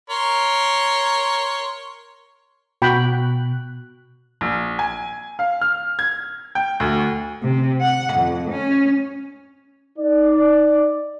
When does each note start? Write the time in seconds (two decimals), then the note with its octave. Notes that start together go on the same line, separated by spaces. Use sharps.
0.10 A#4 C#5 C6
2.82 B2 F#4 G5 B5 F#6
4.41 A#1
4.79 G#5
5.39 F5
5.61 F6
5.99 G#6
6.55 G5
6.80 D2
7.43 C3
7.81 F#5
8.14 F2
8.51 C#4
9.98 D#4 D5